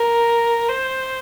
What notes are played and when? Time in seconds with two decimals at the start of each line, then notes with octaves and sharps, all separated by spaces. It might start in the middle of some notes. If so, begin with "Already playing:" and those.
Already playing: A#4
0.69 C5